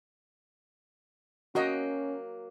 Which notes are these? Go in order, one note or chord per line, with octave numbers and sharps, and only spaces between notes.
F#3 A#3 C#4 F#4 D#5 G5